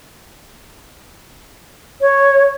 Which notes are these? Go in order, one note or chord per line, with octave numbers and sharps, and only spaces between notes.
C#5